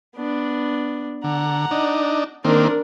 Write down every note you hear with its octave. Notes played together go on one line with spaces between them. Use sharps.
B3 D4
D3 F#5 A#5
D4 D#4
D#3 A#3 C4 D4 A#4